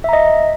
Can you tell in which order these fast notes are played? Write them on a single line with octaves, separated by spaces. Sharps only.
E5 A#5 D#5